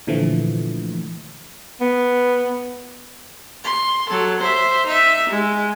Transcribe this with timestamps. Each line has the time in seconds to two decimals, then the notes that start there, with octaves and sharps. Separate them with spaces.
0.07 A#2 D3 E3 F3 A3
1.81 B3
3.65 C6
4.09 F#3 A4
4.39 C5 E5
4.86 D#4 E5
5.29 G#3